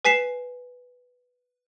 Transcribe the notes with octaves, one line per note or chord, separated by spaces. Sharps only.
B4 G#5 B6 C7 E7